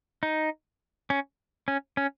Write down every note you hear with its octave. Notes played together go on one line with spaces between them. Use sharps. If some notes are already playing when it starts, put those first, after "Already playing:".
D#4
C#4
C#4
C#4